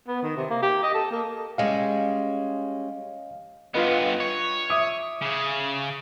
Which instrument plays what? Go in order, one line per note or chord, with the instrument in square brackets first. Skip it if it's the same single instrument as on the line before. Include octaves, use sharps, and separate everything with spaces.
[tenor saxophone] B3
D#3
C3
A#3
G4
D#5
A4
A#3
[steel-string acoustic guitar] G3 G#3 C#4 [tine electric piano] D#5 F5
[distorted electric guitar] G2 B3 [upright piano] F4 B4 D#5
[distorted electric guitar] C#5
[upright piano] E5 D6 D#6
[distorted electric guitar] C#3 G#4